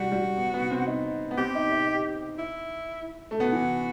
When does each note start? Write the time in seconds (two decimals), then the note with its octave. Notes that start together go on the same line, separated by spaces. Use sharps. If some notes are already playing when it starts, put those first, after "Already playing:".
Already playing: G3 F#4
0.12 G3
0.37 B3
0.54 B3
0.71 C4
0.87 D#4
1.31 B3
1.38 C4 G4
1.55 D#4
1.72 D#4
2.38 E4
3.31 A3
3.40 B3 F#4
3.52 E3